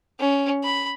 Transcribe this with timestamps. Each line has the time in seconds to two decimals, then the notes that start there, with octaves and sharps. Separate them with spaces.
0.20 C#4
0.64 B5